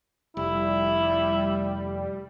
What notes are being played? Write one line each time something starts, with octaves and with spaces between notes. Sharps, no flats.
F1 G3 E4